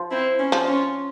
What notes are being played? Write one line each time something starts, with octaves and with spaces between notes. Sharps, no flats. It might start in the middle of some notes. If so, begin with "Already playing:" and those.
Already playing: F3
C4 E4
C#4
F3
C#4 F4